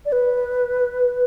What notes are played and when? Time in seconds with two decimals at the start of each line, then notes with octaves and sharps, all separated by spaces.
0.06 D5
0.12 B4